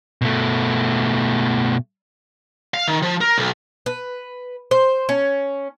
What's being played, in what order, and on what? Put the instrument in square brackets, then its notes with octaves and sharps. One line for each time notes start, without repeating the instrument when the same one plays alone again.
[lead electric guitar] B2 A3
F5
D#3
F3
A#4
B1
[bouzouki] B4
C5
C#4